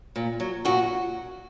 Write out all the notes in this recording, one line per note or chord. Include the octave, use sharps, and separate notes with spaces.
A#2
F#3
A#2 F#4